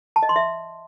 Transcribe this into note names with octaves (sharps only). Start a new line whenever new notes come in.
A5
D#5
C6
E5